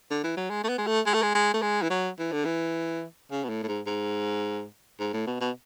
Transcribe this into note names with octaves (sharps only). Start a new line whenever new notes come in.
D3
E3
F#3
G#3
A3
B3
G#3
A3
G#3
A3
G#3
G#3
A3
G#3
E3
F#3
E3
D3
E3
C#3
B2
A2
A2
G#2
G#2
G#2
A2
B2
B2